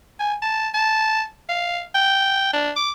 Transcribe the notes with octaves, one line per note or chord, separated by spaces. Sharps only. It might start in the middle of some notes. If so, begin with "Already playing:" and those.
G#5
A5
A5
F5
G5
D4
D6